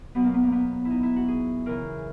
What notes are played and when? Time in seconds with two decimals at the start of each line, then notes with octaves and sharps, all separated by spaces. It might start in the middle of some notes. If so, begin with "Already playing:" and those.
0.15 B2 F#3 B3
0.24 A#3
0.34 B3
0.43 A#3
0.52 B3
0.85 E4
0.90 D#4
1.03 E4
1.16 F#4
1.28 G#4
1.66 C#3 E3 A#4